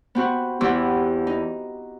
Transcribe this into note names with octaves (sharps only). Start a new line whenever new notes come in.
B3 C4 F#4
E2 E3 C4 F#4 G4 E6
D#4